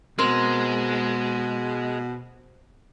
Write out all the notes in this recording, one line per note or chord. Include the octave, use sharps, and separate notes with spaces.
B2 G#3 C4 A#4